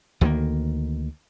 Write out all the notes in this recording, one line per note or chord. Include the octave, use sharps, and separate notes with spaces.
D2 D#3 G#3 A#3